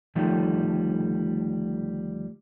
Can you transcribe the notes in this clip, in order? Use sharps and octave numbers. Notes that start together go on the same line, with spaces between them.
D2 D#3 F3 G3 A3